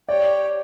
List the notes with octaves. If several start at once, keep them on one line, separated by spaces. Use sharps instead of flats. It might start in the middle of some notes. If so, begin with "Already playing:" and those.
G4 C#5 D5 G5